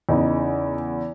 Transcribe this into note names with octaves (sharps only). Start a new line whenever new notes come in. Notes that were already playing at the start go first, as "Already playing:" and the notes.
E2 C#3 E3 D#4